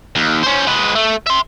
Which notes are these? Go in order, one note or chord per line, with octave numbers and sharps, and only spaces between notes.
D#2
C#4 C5
G#3 B4
A3
E5 C6